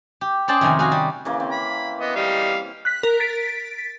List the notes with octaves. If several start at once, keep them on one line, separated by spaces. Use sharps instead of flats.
G4
C#4 G#4 C5 D5 G5 A5
F2 C3 D#3 A3 G#5
F#4 G#4 F5 G#5
G3
C#3 E3 A#3
C4
B5
B3 D#5
G3 D#5 F5
F#6 B6
A#4
A6 B6 D7